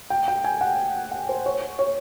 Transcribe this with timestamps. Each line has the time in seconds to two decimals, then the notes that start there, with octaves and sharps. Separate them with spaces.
0.10 G5
0.28 G5
0.44 G#5
0.61 F#5
1.11 F#5
1.29 C5
1.46 C#5
1.79 C#5